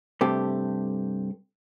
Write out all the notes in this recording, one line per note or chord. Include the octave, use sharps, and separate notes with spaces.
G2 C3 A3 G4